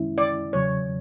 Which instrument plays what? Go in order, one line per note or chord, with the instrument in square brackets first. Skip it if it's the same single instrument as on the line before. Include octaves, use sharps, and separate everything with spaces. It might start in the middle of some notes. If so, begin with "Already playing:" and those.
Already playing: [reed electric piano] F#2 D#3 G#3 C#4 E4
[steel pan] D5
[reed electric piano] E2 C#3 F#3 [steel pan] C#5